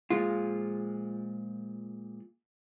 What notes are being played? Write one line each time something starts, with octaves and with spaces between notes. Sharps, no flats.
A#2 F3 G#3 F4